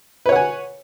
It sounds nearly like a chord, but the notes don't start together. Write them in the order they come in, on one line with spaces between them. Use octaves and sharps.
B4 C#5 F#5 G#5